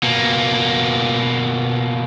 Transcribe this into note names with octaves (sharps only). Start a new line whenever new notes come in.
B2 A#3